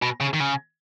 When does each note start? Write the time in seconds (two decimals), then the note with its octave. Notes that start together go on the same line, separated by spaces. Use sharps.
0.02 B2
0.21 C#3
0.34 D#3
0.40 C#3